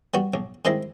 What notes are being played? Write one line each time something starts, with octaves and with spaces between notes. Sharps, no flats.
G3 B3 F#4
B1
D3 D#3 G#3 C4 E4